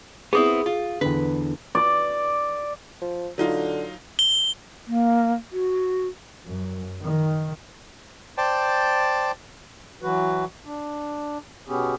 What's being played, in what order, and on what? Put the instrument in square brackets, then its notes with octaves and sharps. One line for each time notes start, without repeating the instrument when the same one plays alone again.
[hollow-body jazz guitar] B3 C4 E4 [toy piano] G#4 D#6
[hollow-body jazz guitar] F4
[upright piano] E2 D3 [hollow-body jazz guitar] B4
[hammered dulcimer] D5
[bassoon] F3
[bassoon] D3 [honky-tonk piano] F#3 D#4 F4
[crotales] G7
[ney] A#3
F#4
[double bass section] F#2
D#3
[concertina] C5 D5 G5 A5
[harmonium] E3 F#3 F#4 B4
D4
B2 B3 C#4 G4 G#4